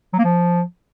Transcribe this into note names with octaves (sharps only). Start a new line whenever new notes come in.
F#3
A#3
F3